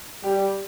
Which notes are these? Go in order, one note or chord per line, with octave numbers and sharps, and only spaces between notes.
G3 G4